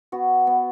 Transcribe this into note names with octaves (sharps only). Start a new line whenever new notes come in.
B3 F#4
B3